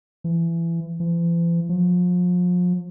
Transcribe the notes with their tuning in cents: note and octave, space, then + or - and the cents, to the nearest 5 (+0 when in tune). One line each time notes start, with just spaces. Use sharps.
E3 +25
E3 +45
F3 +35